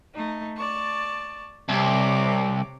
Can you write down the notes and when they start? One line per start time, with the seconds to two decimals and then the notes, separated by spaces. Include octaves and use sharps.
0.14 A3 D#4
0.56 D5 A5 C#6
1.69 C2 C3 C#5 D6